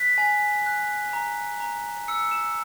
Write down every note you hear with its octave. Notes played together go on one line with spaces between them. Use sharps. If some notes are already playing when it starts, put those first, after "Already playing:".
Already playing: F#6 B6
G#5
F#6
A#5
A#5
E6 C#7
E7